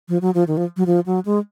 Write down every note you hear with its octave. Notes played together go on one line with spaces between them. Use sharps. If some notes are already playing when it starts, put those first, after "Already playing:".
F3
F#3
F3
D#3
F3
F#3
F3
F#3
G#3